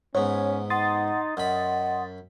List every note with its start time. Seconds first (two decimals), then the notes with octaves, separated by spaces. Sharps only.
0.15 G#2 B3 C#4 C#5
0.70 D#4 F#5 C6 D#6 A6
1.37 F#2 D#5 F#5 B5